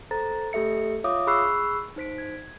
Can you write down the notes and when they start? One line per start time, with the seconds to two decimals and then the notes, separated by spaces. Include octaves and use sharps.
0.11 A4 C5 A#5 A6
0.53 A3 G4 A4 E5 C#7
1.04 F4 C#5 E5 F5 D6 D#6
1.27 G#4 B5 C#6 E6 F#6 C7
1.96 D#4 C5 B6 D7
2.18 G#6